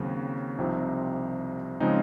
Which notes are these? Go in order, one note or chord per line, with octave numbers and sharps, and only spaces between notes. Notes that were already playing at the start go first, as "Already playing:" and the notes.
Already playing: D#2 C#3 F#3 C4 F#4
C2 C3 F3 C4 D#4
C#3 F3 G#3 C4 D#4